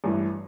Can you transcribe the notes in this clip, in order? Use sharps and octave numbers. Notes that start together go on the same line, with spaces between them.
A1 G2 E3